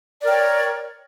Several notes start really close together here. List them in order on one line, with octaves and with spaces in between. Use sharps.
D5 A#4 G5 C#5